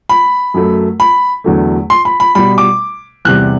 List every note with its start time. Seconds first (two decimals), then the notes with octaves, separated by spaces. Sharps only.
0.09 B5
0.54 F#2 F#3 A3
1.00 B5
1.44 E2 D3 F#3 A3
1.90 C6
2.05 B5
2.20 B5
2.35 B2 G3 B5
2.58 D6
3.25 E2 C3 G3 F#6